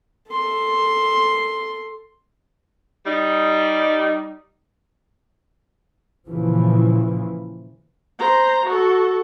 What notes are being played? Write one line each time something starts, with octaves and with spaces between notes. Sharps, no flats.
A4 C6
G3 D#4
A#2 C#3 E3 F3
C5 A#5
F#4 A4